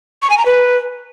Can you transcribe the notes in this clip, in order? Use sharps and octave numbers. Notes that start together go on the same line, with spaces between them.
C#6
G#5
A#5
B4